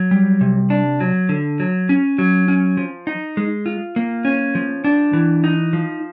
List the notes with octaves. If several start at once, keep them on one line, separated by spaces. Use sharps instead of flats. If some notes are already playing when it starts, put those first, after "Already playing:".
Already playing: F#3
G3
C3
D4
F#3
D3
F#3
C#4
F#3
C#4
F3
D#4
G#3
F4
A#3
C#4
F3
D4
E3
D#4
F3